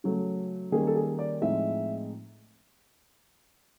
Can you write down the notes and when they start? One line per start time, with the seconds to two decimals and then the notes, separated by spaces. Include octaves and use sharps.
0.04 C#3 F#3 A3
0.72 D#3 G3 A#3 C#4 G#4
0.87 A4
0.96 G#4
1.19 D5
1.41 A2 F3 G#3 C4 D#4 E5